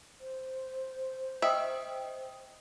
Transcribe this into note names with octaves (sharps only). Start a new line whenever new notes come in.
C5
D#5 E5 G5 D#6